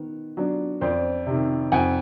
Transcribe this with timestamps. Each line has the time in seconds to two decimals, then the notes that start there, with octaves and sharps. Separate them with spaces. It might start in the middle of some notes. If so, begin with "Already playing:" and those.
Already playing: D#3 B3
0.37 F#3 B3 D4
0.81 F2 C5 D5
1.26 C3 D#3
1.72 F2 F#5 G#5